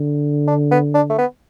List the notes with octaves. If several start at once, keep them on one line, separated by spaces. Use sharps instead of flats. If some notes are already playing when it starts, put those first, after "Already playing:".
Already playing: D3
D4
B3
D4
A3
B3